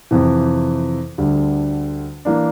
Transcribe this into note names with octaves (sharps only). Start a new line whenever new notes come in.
F2 C3 E3
D2 D3 G3
E3 A#3 D4